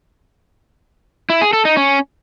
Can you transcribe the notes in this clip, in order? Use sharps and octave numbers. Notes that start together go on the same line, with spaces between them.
E4
G#4
A4
D#4
C#4